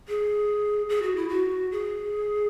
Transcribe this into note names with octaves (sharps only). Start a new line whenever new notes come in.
G#4
G#4
F#4
E4
F#4
G#4